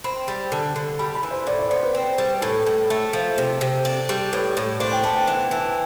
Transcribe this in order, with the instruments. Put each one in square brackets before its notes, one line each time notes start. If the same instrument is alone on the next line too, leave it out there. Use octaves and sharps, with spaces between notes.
[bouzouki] C4 [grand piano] B5
[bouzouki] G3
[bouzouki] D3 [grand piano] A5
[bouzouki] D3
[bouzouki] G3 [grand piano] B5
[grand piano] B5
[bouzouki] E3
[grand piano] C5
[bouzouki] A2 [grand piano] D5
[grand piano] D5
[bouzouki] B3 [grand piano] C5
[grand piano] B4
[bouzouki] C4
G3
[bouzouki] A2 [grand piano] A4
[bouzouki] A2
[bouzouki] A3 [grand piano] A4
[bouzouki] F3
C3
C3
D4
G3
[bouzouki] A2 [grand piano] B4
[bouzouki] A2
[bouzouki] D4 [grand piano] C5
[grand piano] G5
[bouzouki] B3 [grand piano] A5
[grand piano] G5
[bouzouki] E3
E3